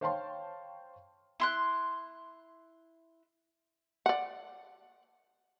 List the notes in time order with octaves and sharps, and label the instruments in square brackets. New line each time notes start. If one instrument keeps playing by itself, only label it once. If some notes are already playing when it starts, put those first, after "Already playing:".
[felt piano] C5 C#5 F5 G5 A5 C6
[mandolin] E4 C6 F#6
[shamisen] D5 F#5